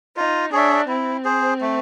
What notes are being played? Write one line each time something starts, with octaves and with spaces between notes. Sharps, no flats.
D#4 F4
D4 G#4 C#5 E5
C4 E4
G#4 C5
A3